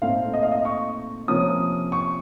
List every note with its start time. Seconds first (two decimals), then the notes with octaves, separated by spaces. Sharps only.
0.02 A#2 A3 C4 D#4 F5
0.33 D#5
0.43 F5
0.52 D#5
0.65 C#6
1.28 C3 F3 A#3 C#4 D#6
1.92 C#6